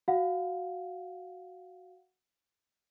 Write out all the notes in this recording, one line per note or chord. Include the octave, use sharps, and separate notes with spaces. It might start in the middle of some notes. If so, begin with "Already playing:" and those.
F#4 F5 F#5